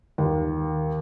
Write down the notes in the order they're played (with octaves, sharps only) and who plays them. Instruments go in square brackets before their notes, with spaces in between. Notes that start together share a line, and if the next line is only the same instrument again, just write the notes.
[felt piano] D#2